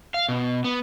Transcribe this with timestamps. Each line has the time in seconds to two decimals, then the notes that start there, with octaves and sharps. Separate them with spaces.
0.14 F5
0.29 B2
0.64 B3